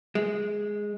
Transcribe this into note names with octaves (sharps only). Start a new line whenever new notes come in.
G#3